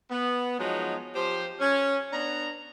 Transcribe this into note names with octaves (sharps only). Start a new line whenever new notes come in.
B3
F3 F#3 G#3 D#4
F3 G4 C5
C#4
B3 D4 A#5